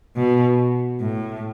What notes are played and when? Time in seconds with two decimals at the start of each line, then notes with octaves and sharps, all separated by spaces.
0.17 B2
1.01 A2